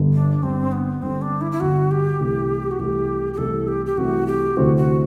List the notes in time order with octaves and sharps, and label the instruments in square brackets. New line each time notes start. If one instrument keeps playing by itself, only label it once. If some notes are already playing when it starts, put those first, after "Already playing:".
Already playing: [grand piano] G1 G2 D3
[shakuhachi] D4
[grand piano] G1 G2 D3 [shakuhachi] C4
[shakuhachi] B3
[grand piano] G1 G2 D3 [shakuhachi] C4
[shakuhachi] D4
E4
E4
[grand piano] G1 G2 D3 [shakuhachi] F#4
[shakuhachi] G4
[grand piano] C2 C3 E3 A3
[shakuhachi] F#4
[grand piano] C2 C3 E3 A3 [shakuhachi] G4
[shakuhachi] G4
[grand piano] C2 C3 E3 A3 [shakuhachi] A4
[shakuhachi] G4
G4
[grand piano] C2 C3 E3 A3 [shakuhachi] F#4
[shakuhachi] G4
[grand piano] D2 C3 E3 A3 C4 [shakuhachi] F#4
[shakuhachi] F#4